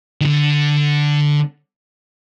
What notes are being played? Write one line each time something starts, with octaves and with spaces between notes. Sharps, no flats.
D#3
D3